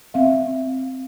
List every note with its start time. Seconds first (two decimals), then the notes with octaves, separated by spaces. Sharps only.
0.14 C4 E5 F5